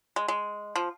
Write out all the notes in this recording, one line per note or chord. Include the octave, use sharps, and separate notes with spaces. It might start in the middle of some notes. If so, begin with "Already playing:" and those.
G#3
G#3
F3